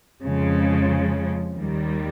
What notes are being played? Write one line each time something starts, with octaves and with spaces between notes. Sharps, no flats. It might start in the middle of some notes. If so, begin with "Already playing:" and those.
F2 C#3 F3 G#3
D#2 D#3 G3